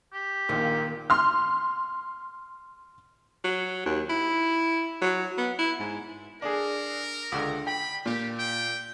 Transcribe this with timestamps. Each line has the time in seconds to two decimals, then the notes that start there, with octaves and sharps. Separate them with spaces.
0.13 G4
0.49 A#1 A#2 D#3 A#3 F4
1.10 C6 F6
3.44 F#3
3.86 D#2
4.10 E4
5.02 F#3
5.38 B3
5.59 E4
5.80 G#2
6.42 D4 G#4 A#4
7.32 C#2 D3
7.67 G5 B5
8.06 A#2 G4
8.39 G5